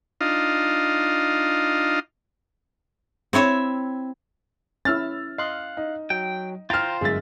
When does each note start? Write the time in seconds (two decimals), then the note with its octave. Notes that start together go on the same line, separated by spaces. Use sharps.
0.21 D4 D#4 F4 D#5 F5
3.33 C4 E4 C#5 E5
4.85 C#4 E4 E6 F6 A6
5.38 D#5 F5 C6 F#6
5.77 D#4
6.10 F#3 G5
6.70 F4 C5 G5 A#5 F6 A6
7.01 G1 F#2 G#3 E5 A6